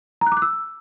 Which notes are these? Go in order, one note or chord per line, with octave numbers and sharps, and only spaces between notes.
A#5
F#6
D6
F#6
E6